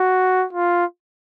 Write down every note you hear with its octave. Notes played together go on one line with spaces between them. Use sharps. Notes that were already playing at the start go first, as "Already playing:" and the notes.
Already playing: F#4
F4